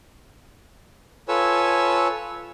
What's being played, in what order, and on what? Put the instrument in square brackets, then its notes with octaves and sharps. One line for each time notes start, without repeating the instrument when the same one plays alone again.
[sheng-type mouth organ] F4 A4 B4 C#5 G#5 E6